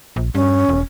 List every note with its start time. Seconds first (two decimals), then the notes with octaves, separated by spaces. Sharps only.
0.16 A#1
0.35 G2 C#4
0.69 E1